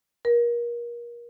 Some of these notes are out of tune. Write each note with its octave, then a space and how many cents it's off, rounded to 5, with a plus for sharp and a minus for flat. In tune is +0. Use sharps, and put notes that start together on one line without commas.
A#4 +30